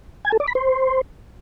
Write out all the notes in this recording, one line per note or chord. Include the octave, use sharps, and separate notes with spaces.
G#5
A4
D5
B5
C5